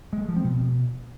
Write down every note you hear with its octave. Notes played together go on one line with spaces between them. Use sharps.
G#3
A3
F3
C4
B2